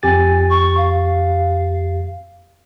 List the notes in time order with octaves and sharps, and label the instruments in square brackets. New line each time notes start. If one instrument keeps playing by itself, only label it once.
[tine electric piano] F2 G4 A6 [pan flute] G#5
[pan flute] C#6
F5